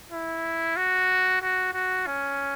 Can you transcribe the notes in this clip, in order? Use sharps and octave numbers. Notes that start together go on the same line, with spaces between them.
E4
F#4
F#4
F#4
C#4